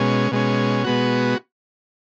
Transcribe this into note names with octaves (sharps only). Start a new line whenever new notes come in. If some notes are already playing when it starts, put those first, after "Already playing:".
Already playing: B2 G#3 C#4
B2 G#3 C#4
B2 G#3 B3 F#4